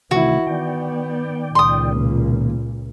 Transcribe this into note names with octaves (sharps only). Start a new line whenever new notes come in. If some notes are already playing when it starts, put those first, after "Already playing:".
C3 D#3 E3 A3 E4 F#4
D#3 B3 D5 G5
C#2 A#2 C6 D#6
B2 D#3 A#3